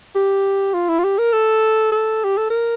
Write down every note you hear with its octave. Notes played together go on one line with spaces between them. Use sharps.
G4
F4
E4
F4
G4
A#4
A4
A4
G4
A4
A#4